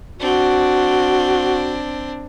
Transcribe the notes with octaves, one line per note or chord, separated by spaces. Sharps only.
C4 D4 F#4